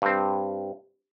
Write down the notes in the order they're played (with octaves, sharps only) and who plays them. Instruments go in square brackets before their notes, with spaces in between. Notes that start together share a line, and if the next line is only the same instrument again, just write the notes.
[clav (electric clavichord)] G2 C4